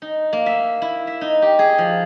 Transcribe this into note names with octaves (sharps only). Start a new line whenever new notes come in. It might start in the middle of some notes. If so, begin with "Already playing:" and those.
D#4
A#3
E5
E4
E5
D#4
G4
G#4
F3